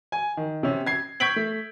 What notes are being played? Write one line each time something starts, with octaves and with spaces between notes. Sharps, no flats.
G#5
D#3
C3 C#4
G#6 C7
C#6 G6 G#6 B6 D7 F#7
A3